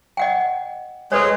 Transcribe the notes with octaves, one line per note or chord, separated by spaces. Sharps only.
D#5 F#5 G5
G#3 G#4 A4 B4 C#5